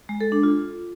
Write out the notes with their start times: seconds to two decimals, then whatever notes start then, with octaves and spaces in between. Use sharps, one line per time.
0.09 G#3
0.21 A4
0.32 D4
0.43 F4